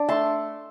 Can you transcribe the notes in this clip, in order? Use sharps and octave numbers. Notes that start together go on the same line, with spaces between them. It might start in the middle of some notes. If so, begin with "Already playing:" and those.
Already playing: D4
A3 A5 C6